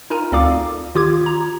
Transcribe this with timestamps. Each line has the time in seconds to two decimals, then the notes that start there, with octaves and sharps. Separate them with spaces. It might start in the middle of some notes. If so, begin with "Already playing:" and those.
0.10 D#4 F4 A#4 G#5 A#5
0.32 D2 C4 A4 D5 F5 D6
0.95 D#3 F4 G4 D6 G#6
1.26 A#5